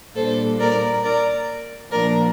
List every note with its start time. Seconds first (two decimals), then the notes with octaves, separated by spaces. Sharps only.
0.15 A#2 G3 A#3 D4 A4 C5
0.59 A#4 D5
1.03 A#4 D5
1.91 A#2 F3 A#3 D4 A#4 D5